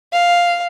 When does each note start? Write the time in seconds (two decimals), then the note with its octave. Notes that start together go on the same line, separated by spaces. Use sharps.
0.13 F5